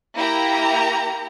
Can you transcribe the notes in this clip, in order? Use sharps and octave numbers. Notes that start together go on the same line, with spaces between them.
A#3 E4 G4 A#5